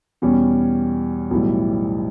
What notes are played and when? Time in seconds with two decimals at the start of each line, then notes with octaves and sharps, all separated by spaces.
0.22 E2 B2 G3 C#4
1.31 B1 A2 E3 G3